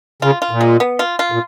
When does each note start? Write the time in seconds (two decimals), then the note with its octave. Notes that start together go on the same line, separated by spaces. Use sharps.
0.22 C#3 F4
0.42 F4
0.51 A#2
0.61 G#3
0.80 B3
0.99 F4
1.19 F4
1.32 A#2